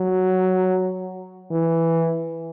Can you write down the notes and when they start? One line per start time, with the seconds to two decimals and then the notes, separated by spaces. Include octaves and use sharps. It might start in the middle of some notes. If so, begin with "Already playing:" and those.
Already playing: F#3
1.51 E3